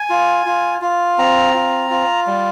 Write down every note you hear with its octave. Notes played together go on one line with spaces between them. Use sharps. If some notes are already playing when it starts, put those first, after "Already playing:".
Already playing: G#5
F4
F4
F4
C4 A#5
F4
F4
G3